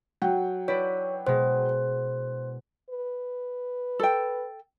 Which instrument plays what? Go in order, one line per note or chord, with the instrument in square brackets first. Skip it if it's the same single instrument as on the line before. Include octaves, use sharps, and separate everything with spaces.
[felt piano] F#3 F#5 G5
[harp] E4 B4 D5 [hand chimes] C#5
[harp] B2 G#3 [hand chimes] C5
[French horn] B4
[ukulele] A4 G5